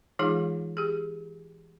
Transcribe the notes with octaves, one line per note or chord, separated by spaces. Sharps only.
E3 G#3 D#4 F4 G#4 F5
G4 G#4